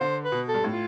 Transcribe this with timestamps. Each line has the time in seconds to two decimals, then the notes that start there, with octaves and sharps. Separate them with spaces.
0.01 D3 C5
0.25 B4
0.32 B2
0.48 A4
0.54 G2
0.64 A2
0.72 F4